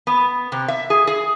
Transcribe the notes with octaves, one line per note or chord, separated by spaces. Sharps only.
B3
C3
E5
G#4
G#4